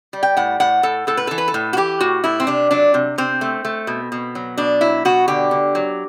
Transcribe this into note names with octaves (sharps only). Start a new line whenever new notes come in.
G3
G5
A2 F#5
A2 F#5
A2 A4
A2 A4
B4
E3 A4
B4
A4
A2
F#4
E3 G4
A2 F#4
A2 E4
C4
C3 D4
F#3 D4
C3
C3 C4
A3
A3
B2
B2
F#3
B2 D4
F#3 E4
B2 F#4
D3 G4
D3
F#3